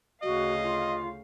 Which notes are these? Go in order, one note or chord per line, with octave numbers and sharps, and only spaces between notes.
D2 C#3 F#4 D#5 F5
F4